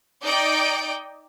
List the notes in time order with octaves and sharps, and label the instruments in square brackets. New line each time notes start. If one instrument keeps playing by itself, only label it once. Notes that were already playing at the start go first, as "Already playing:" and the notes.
[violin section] D#4 D5 D#5 G5 G6 D7